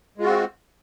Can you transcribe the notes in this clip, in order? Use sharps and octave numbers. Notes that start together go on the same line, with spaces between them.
G#3 C4 F4 F#4